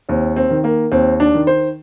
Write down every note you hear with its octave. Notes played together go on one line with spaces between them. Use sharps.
D#2 C4
C4
D#3
A#3
D#2 C4
D4
D#3
C5